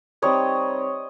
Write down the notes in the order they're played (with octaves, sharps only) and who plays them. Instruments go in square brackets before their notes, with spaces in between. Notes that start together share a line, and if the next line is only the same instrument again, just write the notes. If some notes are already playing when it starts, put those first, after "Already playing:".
[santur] G3 C4 D#4 C#5 D#5